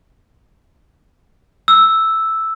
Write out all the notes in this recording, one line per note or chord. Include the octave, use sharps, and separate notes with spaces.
E6